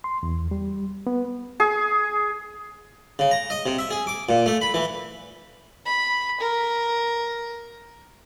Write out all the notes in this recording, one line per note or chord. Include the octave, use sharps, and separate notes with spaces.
C6
E2
G3
B3
G#4
C#3
A#5
D#5
C3
E5
G#4
D6
A#2
A3
B5
E3
B5
A#4